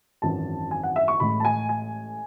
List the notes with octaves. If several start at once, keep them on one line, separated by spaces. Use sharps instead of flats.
G#1 F#2 E3 A5
G#5
F#5
E5
C#6
A1 A2 G#3 B5
A5
G#5
G#5